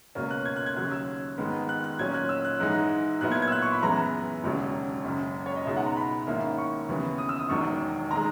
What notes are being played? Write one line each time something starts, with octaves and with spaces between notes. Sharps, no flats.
C#2 B2 A#3 C#4
F#6
G#6
F#6
G#6
D#2 C#3 F#3 F#6
E6
G#2 D#3 G#3 B3
F#6
F#6
A#2 F#3 C#4 G#6
F#6
E6
F#6
G#2 E3 G#3 D#4 F#6
A#2 F#3 B3 E4 F#6
G#6
G#6
E6
F#6
C#6
B5
F#2 E3 G#3 B3 A#5
E1 D#2 C#3 F#3
F#1 F#2 C#3
C#5
D#5
C#2 B2 G#3 D#4 E5
F#5
A#5
B5
G#2 D#3 A#3 C#4 E4
C#6
D#2 C#3 E3 B3
D#6
E6
D#6
E1 E2 D#3 F#3 C#6
D#3 G#3 A#5